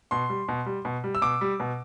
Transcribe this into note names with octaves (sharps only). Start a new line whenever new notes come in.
B2 C6
G3
B2
G3
B2
G3
E6
B2 D6
G3
B2